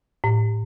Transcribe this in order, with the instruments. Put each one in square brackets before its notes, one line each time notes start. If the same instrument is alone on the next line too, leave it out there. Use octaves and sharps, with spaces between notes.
[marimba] A2